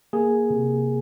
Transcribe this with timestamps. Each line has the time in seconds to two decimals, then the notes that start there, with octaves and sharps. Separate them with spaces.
0.13 A#3 G#4
0.50 C3